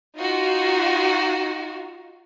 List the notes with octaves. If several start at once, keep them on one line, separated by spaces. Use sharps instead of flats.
D#4 F4 F#4